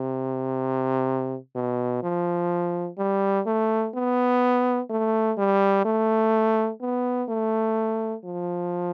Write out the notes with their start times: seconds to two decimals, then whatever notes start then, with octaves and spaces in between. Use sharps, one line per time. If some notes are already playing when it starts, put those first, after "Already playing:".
Already playing: C3
1.55 B2
2.03 F3
2.98 G3
3.46 A3
3.95 B3
4.90 A3
5.38 G3
5.85 A3
6.81 B3
7.29 A3
8.24 F3